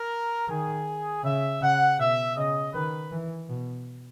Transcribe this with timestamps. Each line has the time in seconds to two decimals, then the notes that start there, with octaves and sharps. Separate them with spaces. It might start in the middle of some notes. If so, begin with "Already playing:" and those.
Already playing: A#4
0.48 D#3 G#4
1.24 C#3 E5
1.61 C#3 F#5
1.98 B2 E5
2.36 C#3 D#5
2.73 D#3 B4
3.12 E3
3.49 B2